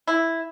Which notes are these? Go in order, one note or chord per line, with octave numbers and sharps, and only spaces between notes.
E4